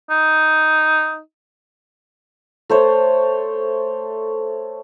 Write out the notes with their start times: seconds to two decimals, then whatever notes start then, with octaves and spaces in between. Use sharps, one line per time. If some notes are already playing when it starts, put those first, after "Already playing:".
0.10 D#4
2.70 A3 C5 C#5